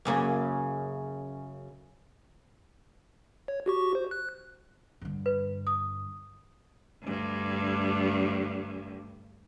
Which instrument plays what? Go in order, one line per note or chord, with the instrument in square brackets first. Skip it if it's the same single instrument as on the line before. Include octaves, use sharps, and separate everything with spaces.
[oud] F#2 C#3 A#3
[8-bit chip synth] C#5
F#4 G4 C#6
C5
F#6
[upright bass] G2 D3
[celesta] B4
D#6
[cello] D2 G2